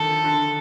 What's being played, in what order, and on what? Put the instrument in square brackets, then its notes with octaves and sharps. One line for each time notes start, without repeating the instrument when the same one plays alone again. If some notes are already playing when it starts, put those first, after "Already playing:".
Already playing: [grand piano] D3 D#3 F3 [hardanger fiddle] A4
[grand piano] D3